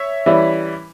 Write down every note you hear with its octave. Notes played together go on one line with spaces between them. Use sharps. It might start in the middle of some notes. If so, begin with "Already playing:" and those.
Already playing: C#5 E5
E3 G3 C#4 E4